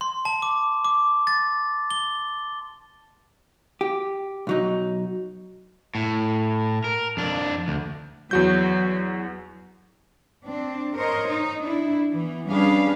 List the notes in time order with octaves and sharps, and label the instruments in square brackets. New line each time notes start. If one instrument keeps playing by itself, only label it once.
[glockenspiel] C6
A5
D6
D6
A6
G7
[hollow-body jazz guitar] G4
B1 F#3 D#4
[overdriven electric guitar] A2
A#4
F2 D4
D2
[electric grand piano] E2 F#4 G6 [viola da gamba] F#3
[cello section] C4 D4
A#4 C5 C#5 D#5
D#4
D4 E4
E3 B3
G3 C#4 D4 G#4 B4 F5